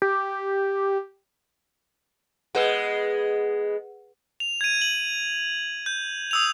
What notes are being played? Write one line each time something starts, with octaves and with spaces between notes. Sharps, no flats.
G4
G#3 B3 G#4 B4 F#5
F7
G#6 D#7
F#7
G6
D#6 E6 F7